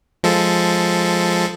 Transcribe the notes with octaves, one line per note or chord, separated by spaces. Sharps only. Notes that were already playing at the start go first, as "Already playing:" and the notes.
F3 G#3 A4